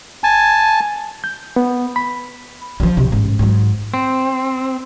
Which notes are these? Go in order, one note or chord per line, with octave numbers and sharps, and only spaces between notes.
G#5 A5
G6
B3
B5
F3 F#3
B1 C3
A1 G#2
G#2 F#3
C4